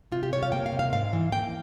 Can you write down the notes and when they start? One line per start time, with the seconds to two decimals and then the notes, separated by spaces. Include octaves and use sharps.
0.12 C3 F4
0.23 G4
0.32 G3 C#5
0.43 F5
0.52 A#3 G5
0.66 F5
0.72 C3
0.79 F5
0.93 G#2 F5
1.13 E3
1.32 A#3 G5